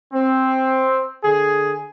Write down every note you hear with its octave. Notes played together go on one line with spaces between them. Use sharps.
C4
D3 G#4